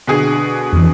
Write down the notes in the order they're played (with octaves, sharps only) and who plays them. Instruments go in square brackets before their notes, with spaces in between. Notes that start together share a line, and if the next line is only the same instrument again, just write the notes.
[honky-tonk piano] B2 D3 G#4
[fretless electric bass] F2 E3